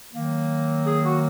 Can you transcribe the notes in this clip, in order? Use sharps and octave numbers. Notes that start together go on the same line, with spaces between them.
D#3 F#3 A#3
G#4
F#4